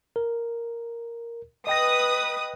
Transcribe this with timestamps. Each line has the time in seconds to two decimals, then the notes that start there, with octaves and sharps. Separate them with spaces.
0.16 A#4
1.67 B4 D#5 G5 D#6 A#6